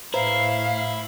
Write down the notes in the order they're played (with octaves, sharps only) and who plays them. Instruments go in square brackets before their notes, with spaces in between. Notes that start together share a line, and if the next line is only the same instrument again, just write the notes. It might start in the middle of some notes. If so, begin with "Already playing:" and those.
[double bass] A2 [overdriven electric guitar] E4 [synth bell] B4 C5 A#5 [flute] F5